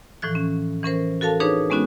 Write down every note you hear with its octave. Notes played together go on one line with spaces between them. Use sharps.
A2 E3 F3 F#6
C#4
E3 C#4 A#4 C5
F#4 A4 A#4 F5 A5
D4 D#4 G#4 B4 C#5
G#3 B3 C#4 D#4 F#4